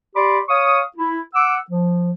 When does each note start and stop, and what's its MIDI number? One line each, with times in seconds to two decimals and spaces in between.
0.15 0.39 67
0.15 0.39 74
0.15 0.39 83
0.15 0.39 84
0.15 0.39 86
0.49 0.80 73
0.49 0.80 77
0.49 0.80 85
0.49 0.80 87
0.97 1.19 64
1.34 1.57 78
1.34 1.57 86
1.34 1.57 88
1.71 2.10 53